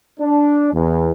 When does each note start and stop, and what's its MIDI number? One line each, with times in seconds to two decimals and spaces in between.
0.20 0.71 62
0.73 1.12 40